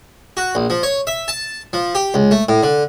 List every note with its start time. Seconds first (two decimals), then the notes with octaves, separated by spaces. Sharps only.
0.37 F#4
0.55 A#1
0.70 F3
0.83 C#5
1.07 E5
1.28 A5
1.73 F3
1.95 G4
2.14 C#2
2.31 A3
2.49 A2
2.63 D3